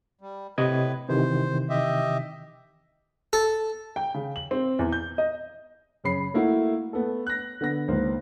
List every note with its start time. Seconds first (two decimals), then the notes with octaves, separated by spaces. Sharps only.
0.21 G3
0.58 A2 C3 B4 D#5 G#6
1.09 C3 D#3 E3 C5
1.70 G4 D#5 E5
3.33 A4
3.96 G5
4.14 C#3
4.36 F#7
4.51 C4
4.79 E2
4.92 G6
5.18 D#5
6.04 F#2 C#3 C#5 B5 C7
6.34 A3 A#3 E4 F#4
6.93 A3 B3 A4
7.27 F#6 A#6
7.61 D3 B3 A#6
7.88 C#2 D#3 A#3 C5